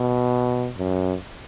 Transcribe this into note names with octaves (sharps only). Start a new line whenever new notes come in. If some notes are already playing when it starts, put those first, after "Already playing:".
Already playing: B2
F#2